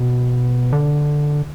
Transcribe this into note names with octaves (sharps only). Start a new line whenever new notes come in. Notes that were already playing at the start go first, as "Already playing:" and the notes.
Already playing: B2
D3